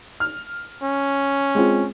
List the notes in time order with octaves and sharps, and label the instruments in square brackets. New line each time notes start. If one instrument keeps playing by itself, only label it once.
[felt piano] F6
[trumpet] C#4
[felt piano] G#3 C4 F4